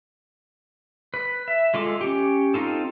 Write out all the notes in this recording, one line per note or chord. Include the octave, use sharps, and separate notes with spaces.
B4
E5
G#3 F4 A4 D6
C#4 G4
C4 D#4 F4 A4